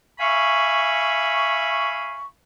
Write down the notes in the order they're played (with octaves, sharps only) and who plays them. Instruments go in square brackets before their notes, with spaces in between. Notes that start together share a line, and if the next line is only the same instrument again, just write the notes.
[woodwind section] E5 F5 G#5 B5 C#6